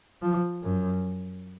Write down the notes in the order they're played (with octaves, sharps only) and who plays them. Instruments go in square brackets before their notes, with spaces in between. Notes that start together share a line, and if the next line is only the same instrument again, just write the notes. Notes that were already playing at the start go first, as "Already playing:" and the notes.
[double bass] F3
F#2